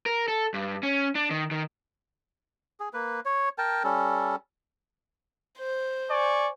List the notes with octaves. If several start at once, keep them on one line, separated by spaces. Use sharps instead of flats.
A#4
A4
G2
C#4
D4
D#3
D#3
G#4
A#3 B4
C#5
A#4 G5 A5
G3 C#4 A4
C5
D5 G#5 C#6